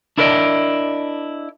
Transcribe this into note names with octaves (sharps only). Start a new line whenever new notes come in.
D4 E4 A#4 B4 D5 D#5